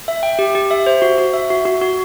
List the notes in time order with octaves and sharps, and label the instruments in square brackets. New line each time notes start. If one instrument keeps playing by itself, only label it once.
[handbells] E5
G5
G4
G4
E5
C5
F#4
F#4
E5
F#4
F#4
F#4